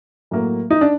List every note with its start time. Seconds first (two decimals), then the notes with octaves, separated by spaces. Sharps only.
0.31 A2 F#3 A#3
0.70 D#4
0.81 D4